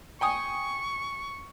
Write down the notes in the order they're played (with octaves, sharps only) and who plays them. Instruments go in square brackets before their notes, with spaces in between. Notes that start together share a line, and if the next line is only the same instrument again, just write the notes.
[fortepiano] G5 G#5 D#6 [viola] C#6